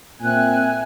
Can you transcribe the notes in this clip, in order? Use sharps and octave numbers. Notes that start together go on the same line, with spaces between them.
A#2 C4 E5 G#5 F#6